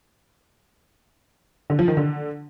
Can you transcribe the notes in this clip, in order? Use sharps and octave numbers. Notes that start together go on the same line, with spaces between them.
D3
F3
D#3
D3